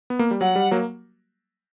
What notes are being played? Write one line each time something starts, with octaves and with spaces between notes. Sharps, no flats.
B3
A#3
G3
F#3 F#5
G3
F#3 A#3